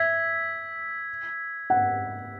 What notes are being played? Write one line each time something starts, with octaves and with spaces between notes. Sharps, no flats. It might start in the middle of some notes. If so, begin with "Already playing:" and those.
Already playing: E5 E6 G#6 B6
F#5